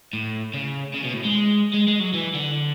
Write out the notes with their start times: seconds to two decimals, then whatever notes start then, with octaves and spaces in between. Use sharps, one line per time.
0.13 A2
0.54 C#3
0.94 C#3
1.03 B2
1.13 A2
1.24 G#3
1.74 G#3
1.88 G#3
2.00 F#3
2.14 E3
2.34 D3